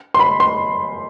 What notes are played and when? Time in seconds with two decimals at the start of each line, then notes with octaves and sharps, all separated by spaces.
0.14 C6
0.19 B5
0.40 C6